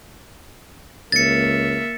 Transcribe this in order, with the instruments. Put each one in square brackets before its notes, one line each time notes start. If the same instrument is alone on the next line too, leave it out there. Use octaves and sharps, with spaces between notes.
[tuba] C#2 [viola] A#3 E5 [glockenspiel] A6 C#7